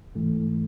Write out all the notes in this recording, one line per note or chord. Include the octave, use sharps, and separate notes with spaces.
G#2 E3 A3